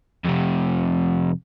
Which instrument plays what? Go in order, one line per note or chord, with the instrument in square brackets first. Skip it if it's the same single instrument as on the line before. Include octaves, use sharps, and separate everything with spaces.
[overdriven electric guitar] F2 C3